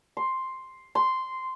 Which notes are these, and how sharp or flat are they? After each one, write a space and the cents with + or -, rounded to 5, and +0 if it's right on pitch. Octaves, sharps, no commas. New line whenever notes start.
C6 +5
C6 -10